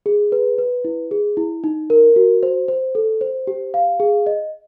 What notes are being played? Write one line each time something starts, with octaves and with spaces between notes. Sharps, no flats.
G#4
B4
B4
E4
G#4
E4
D#4
A#4
F#4
C5
C5
A4
C5
G4
F5
G#4
D#5